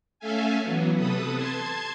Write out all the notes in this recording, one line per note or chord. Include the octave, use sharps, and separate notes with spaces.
A3 C#4 A4 E5 F5 G#5
E3 F#3 B3
C3 A4 B4 D#6
A5 C6 G#6